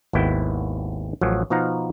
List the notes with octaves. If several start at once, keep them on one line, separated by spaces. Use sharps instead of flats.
G#1 D#2 B3 E4 G5
A1 F3 F#3
B2 F3 D#4 F5 F#5 A#5